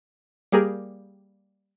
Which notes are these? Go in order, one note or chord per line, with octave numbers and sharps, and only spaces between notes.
G3 A#3 G4 G#4 A#4